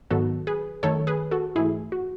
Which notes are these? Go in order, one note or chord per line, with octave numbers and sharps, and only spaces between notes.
G#2 D#3 F#3 B3 F#4 A4
G#4 B4
F#2 D#3 A3 A4 C#5
G#4 B4
F#4 A4
G#2 E3 A3 E4 G#4
F#4